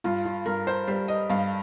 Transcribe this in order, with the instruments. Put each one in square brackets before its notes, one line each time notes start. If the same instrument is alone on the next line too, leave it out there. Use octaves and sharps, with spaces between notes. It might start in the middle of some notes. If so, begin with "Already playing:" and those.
[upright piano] G2 [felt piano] F4
[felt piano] F4
[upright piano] G2 [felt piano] A#4
[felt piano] C5
[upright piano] G3 [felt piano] C5
[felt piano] D#5
[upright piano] G2 [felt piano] F5